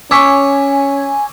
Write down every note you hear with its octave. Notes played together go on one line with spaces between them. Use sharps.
C#4 C#5 G#5 C#6 D6 E6 B6